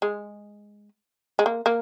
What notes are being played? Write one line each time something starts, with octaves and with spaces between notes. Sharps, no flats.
G#3
G#3
A#3
A#3